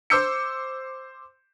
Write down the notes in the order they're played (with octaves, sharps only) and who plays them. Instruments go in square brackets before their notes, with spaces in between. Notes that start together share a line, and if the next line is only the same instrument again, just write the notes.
[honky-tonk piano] C5 D6 E6 G6 C#7